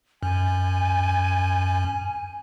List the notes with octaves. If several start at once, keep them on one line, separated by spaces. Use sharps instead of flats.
F#2 G#5